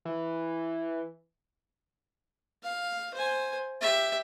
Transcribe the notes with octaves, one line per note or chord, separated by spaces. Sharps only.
E3
F5
C5 G#5
G4 E5